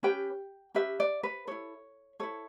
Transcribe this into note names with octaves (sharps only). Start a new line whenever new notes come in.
C#4 G4 B4 G5
C#4 G4 B4 E5
D5
B4
E4 A4 C#5
E4 A4 C#5